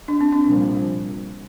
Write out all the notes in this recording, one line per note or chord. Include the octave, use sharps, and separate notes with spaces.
D4
C4
D4
C2 A#2 F3